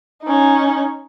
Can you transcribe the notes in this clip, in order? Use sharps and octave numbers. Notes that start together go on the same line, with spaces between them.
C#4 D#4